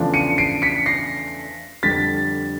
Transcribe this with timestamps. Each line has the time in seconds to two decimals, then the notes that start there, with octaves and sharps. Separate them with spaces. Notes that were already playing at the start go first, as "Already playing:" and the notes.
Already playing: E2 C#3 F3 A3 D4
0.14 C#7 D#7
0.38 C7 D7
0.62 B6 C#7
0.86 A#6 C7
1.83 F2 D3 G3 A6 B6